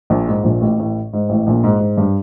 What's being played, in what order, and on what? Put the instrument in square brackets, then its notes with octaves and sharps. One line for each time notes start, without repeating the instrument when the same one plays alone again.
[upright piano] A#1 A#2
G#2
A#1 A#2
A1 A2
A1 A2
G#2
A1 A2
A#1 A#2
G#2
G#2
G2